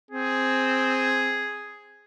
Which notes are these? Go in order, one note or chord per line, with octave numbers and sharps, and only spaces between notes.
C4 G#4